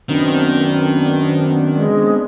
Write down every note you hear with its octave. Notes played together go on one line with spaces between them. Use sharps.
F#2 D#3 B3 C4 D4
G#3